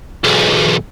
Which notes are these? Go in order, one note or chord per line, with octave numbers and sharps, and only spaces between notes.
B1 E2